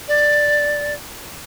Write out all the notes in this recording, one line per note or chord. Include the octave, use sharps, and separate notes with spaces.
D5